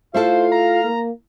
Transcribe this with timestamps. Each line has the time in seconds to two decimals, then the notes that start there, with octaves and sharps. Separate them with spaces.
0.14 A3 E4 F4 A4 C5 F5
0.52 A#5
0.84 A#3